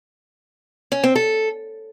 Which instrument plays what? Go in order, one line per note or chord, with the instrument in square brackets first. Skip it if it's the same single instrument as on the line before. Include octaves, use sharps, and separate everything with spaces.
[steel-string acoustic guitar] C#4
C4
A4